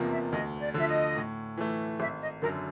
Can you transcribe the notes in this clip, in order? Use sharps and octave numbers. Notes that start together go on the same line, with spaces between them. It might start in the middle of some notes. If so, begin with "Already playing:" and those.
Already playing: F1 E2 C3 F3 A#3
E5
D2 D#5
D5
D3 F3 E5
D#5
A2
E3 A3
G#1 E5
D#5
F#2 D3 A#4